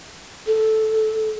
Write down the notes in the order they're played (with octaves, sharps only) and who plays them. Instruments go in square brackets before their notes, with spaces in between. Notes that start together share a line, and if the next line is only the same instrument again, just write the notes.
[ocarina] A4